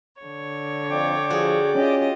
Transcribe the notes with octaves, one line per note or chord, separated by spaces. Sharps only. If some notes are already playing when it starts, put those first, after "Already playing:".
D3 C#5
F2 D5 G5 D6
F3 F#4 G#4
C#4 F4 G4 D#5